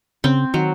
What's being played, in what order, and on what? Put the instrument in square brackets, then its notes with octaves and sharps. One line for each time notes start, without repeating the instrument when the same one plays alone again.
[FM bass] C#3 [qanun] C4
[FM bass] D#3 [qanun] F#3